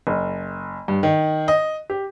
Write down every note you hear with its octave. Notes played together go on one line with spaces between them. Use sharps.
F#1
G2
D#3
D#5
G4